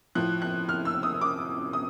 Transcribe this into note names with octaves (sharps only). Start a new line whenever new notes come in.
A2 F3 F#6
F#6
F6
E6
D#6
D6
D#6